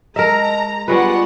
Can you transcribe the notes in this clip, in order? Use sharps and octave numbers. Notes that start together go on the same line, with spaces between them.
G#3 A#4 D#5 E5 A5 A#5
G3 G#3 B3 D4 F4 B4 F#5 C#6